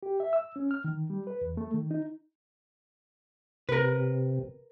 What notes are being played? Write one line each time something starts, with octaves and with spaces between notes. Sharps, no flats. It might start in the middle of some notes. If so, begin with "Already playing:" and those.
G4
E5
E6
C#4
F6
D#3
G3
B4
E2
A3
D#3
D#4
C3 A#4 B4